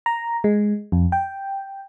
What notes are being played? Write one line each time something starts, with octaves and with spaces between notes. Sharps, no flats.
A#5
G#3
F2
G5